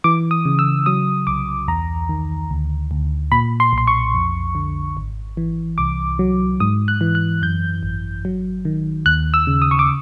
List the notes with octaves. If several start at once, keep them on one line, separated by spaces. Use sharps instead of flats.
E3 D6
D#6
C#3
E6
F#3 D#6
C2 D6
E2 A#5
D#3
D2
D2
A#2 B5
C6
B1 C6
C#6
F2
D3
G#1
E3
C2 D6
F#3
G#2 D#6
F#6
E3
F#6
F#2 G6
G#1
F#3
D#3
D#2 F#6
E6
C#3
D#6
C#6
D6